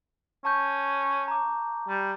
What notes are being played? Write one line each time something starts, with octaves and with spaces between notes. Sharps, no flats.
C#4 A5 C#6 G6
A#5 D6
G3